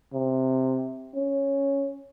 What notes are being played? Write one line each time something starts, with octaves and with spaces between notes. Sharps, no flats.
C3
C#4